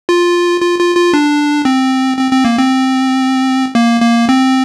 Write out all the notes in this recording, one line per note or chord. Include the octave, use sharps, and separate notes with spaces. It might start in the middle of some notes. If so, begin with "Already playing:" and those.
F4
F4
F4
F4
D4
C4
C4
C4
A#3
C4
A#3
A#3
C4